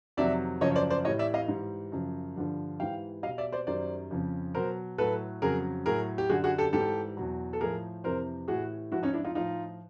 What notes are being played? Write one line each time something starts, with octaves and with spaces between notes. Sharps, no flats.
F2 C3 D#3 F#3 D5 E5
F#2 C#3 F3 C#5 D#5
C#5
C5 D5
C5 D5
A2 E3 G3 C#5 D#5
D5 E5
D#5 F5
G#2 E3 G3
F#2 C#3 F3
G2 D3 F3
G#2 E3 G3 F5 G5
B2 G3 D#5 F5
D5 E5
C5 D5
F#2 D#3 G3 C5 D5
F2 C#3 F3
B2 F#3 A#4 C5
A2 F#3 A4 B4
F2 C#3 F#3 G#4 A#4
A2 F#3 G#4 A#4
G4
F#2 D3 G3 F#4 G#4
F#4 G#4
G4 A4
G#2 E3 G3 G4 A4
E2 B2 F#3
A4
A2 F3 G#4 A#4
F2 C3 E3 A#4 C5
A2 E3 G3 F#4 G#4
G#2 F3 E4 F#4
C#4 D#4
D4 E4
D#4 F4
A2 F3 D#4 F4